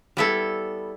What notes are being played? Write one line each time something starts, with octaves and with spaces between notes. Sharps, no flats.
G3 B3 E4 A4